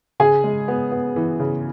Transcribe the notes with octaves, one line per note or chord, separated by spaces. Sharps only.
C#3 G#4 G#5
G#3
B3
B3
E3
C#3